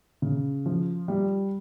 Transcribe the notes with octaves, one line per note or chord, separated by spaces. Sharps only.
C#3
F3
G3